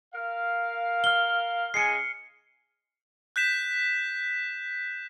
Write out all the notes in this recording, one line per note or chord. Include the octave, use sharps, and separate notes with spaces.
A#4 F5
F6 G7
C#3 G#3 G#5 C7 C#7
F#6 G6 B6 E7